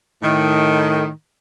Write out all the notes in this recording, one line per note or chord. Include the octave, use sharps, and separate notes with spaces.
A2 D#3